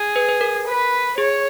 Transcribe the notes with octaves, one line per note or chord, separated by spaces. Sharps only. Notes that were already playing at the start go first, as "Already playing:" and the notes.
Already playing: G#4
B4
B4
A#4
B4
G#4 C#5